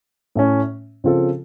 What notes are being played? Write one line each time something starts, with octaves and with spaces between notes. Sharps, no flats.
A2 A3 C#4
C#3 F3 C4 F4 A4